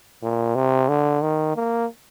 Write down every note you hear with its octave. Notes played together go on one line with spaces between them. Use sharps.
A#2
C3
D3
D#3
A#3